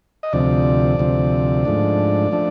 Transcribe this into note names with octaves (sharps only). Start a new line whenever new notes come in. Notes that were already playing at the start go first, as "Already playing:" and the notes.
D#5
D2 C3 F3 D5
D2 C3 F3
G#2 F3 A3 D4
F3 A3 D4